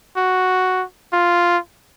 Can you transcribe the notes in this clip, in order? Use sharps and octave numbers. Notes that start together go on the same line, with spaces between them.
F#4
F4